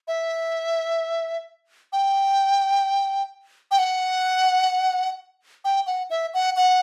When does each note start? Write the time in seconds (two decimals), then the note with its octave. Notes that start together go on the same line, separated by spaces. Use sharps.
0.08 E5
1.93 G5
3.71 G5
3.79 F#5
5.65 G5
5.87 F#5
6.10 E5
6.34 F#5
6.57 F#5